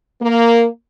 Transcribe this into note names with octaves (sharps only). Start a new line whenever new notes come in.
A#3